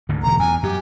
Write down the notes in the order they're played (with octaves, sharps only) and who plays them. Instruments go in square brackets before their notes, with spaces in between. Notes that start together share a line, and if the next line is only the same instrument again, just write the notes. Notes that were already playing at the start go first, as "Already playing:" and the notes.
[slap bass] D2 G#2 D3
[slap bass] E1 A#2 [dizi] A#5
[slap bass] E2 [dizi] G#5
[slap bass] F#2 [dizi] G4